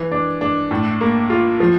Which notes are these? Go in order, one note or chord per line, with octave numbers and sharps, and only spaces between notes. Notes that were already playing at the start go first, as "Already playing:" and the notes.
Already playing: E3
D4
D4
A2
A#3
F4
F3